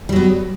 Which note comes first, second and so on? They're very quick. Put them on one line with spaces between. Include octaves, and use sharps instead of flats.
G3 F#3 B3